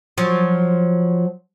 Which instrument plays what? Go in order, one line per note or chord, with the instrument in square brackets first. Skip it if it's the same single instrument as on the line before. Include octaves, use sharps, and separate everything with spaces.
[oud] F3 F#3